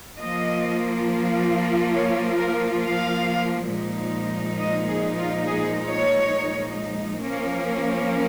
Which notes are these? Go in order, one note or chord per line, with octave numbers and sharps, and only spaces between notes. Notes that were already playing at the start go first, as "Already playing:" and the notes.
F3 A#3 F4 D#5
C#5
A#4
F5
A#2 F3 G#3 D#4
D#5
G#4
F4
G#4
C#5
F3 A#3 C#4